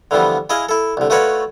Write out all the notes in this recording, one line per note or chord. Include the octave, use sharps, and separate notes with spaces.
D3 E3 F3 G3 B3
E4 G#4 D#5 F5
E4 A4
C2 D3
A3 F4 F#4 B4 C#5 D5